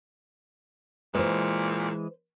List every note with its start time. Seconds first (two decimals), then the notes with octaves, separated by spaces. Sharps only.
1.15 A#2 E3 G#3 B4 C5